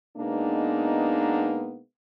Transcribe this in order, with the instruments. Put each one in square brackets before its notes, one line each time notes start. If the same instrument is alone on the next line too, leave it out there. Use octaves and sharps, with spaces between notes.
[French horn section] B2 G#3 A#3 B3 D4 D#4